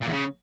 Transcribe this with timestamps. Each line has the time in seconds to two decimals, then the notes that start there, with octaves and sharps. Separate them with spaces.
0.02 A#2
0.07 E2
0.13 C#3